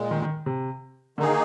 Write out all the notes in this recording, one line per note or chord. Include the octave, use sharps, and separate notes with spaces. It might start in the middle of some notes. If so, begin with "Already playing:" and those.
Already playing: A#2 G#3
D#3
D#3
C3
D3 D#3 A#3 D#4 G#4